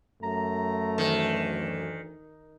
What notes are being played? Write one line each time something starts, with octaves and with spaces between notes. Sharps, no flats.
F#2 A3 A#5
D2 D#3 E3